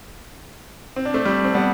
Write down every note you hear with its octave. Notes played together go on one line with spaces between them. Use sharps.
C4
D4
A3 C4
G3
C4
G3 B3